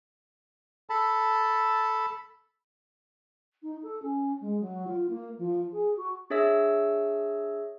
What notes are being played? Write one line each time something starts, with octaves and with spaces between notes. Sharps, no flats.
A4 A5 B5
D#4
A4
C#4
G#3
F#3
F4
A#3
F3
G#4
F#4
D4 G#4 C#5 E5 E6 A#6